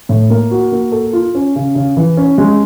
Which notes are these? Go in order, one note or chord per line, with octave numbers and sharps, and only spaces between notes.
A2
A#3
F#4
A#3
A4
F4
C#4
C#3
C#3
E3
C#4
G#3